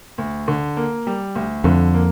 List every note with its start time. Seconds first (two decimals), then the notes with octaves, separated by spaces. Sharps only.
0.18 D2
0.48 D3
0.77 A#3
1.07 G3
1.35 D2
1.64 F2 D3
1.94 A#3